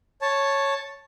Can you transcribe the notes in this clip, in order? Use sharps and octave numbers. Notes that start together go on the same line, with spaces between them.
C#5 A5